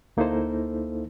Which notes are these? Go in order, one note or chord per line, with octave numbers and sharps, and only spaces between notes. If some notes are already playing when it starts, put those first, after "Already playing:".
D2 A#3 D#4 E4 A4 C5